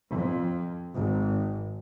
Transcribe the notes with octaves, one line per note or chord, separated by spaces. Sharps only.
F2
G#1